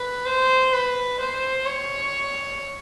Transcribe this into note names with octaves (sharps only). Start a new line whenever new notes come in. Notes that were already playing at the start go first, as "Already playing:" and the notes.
Already playing: B4
C5
B4
C5
C#5